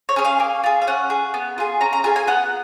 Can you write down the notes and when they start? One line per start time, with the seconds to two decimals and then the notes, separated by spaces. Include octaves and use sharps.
0.09 C#5
0.16 C#4 G#4
0.24 F5
0.40 A#3
0.64 F4 G#4
0.82 F5
0.87 C#4 F#5
1.10 G#4
1.34 B3
1.58 F4 G#4
1.81 C#4 A#5
1.93 A#5
2.04 F4 G#4 G#5
2.16 G#5
2.27 B3 F#5